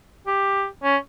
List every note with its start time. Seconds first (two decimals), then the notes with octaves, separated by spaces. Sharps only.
0.27 G4
0.84 C#4